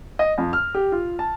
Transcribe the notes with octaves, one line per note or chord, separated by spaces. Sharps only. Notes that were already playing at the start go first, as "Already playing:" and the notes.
D#5
F2
F6
G4
F4
A5